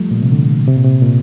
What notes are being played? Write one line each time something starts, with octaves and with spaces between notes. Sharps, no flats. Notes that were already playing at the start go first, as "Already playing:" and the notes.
Already playing: F3 G3 A3
A#2
C3
D3
C3
A#2
C3
A#2